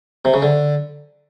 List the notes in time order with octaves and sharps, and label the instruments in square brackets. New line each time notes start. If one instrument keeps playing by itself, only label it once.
[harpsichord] C3
C#3
D3